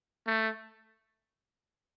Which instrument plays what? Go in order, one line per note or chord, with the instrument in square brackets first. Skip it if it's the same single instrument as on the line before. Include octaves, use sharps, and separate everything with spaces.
[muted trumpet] A3